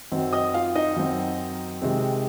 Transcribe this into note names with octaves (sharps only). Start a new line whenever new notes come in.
F#2 D#3 F#3 C4
D#5 D#6
F4 F5
D#4 D#5
F#2 D#3 F#3 C4
C3 D#3 G#3 C4